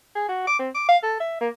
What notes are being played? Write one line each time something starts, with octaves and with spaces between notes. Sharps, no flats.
G#4
F#4
D6
C4
D6
F5
A4
E5
A#3